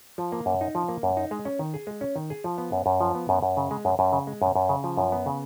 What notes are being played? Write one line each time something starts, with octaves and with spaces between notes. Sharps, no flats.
F3
A#3
F#2
D#4
F3
A#3
F#2
D#4
G#3
C#4
D#3
G#4
G#3
C#4
D#3
G#4
F3
B3
F#2
F#2
F3
B3
F#2
F#2
C#3
G#3
F#2
F#2
C#3
G#3
F#2
F#2
C#3
F3
F#2
B3
C#3